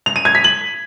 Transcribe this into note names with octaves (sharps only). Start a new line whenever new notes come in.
F7
D#7
G#6
B6
F#7